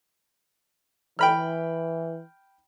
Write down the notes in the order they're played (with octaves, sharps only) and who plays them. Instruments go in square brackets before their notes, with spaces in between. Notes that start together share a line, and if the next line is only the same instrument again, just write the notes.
[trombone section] E3 [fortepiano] G5 B5 F6